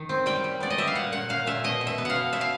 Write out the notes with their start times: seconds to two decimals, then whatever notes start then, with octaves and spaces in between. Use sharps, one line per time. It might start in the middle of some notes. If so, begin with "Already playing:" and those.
Already playing: D#3
0.09 C4
0.26 G3 G5
0.44 G3
0.60 B3 D5
0.70 D#5
0.78 G3 E5
0.87 F5
0.95 A#2 F#5
1.12 A#2 F#5
1.29 A#2 F5
1.46 A#2 E5
1.64 B2 D#5
1.81 B2
1.87 E5
1.98 B3
2.05 F5 F#5
2.16 B2
2.33 B2 E5
2.41 F5